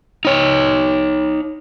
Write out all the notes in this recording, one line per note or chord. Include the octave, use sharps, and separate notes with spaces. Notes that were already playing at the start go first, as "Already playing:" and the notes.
D#4 C#5